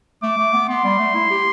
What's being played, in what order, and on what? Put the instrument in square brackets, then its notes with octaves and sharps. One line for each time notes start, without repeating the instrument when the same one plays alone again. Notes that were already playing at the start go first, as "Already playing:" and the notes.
[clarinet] A3 [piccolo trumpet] D6
[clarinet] A3
B3
[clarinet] B3 [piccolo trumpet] C6
[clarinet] G3
A3
E4
G4